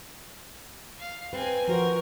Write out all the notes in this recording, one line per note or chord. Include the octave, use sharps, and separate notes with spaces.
F5
C4 B4 G#5
F3 F#4 A#4 C5